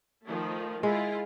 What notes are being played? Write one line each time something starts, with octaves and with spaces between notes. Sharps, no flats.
D#3 F3 A3
G#3 E4 F4